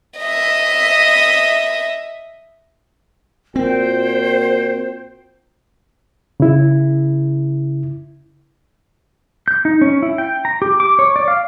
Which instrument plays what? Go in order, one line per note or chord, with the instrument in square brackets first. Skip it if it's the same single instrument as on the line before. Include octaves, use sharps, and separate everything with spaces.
[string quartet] D#5 E5
[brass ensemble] A#2 F#4 G5 [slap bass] C4 [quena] C5
[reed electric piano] C#3 E4
[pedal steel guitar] G6
D#4
C#4
E4
G5
A#5
G4
D6
C#5
D5
F5